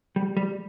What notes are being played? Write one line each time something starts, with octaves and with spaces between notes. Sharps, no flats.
G3
G3